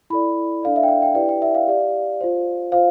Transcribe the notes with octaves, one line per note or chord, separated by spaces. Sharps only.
E4 A4 D5 B5
D4 A4 D5 F5
E5
G5
F5
G5
E4 G4 B4 D5 G5
G5
E5
F5
G4 D5
F4 C5
F4 C5 F5